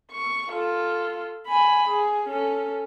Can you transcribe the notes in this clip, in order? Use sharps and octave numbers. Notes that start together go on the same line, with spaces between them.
C#6
F4 A4
G#5 B5
G#4
C#4 A4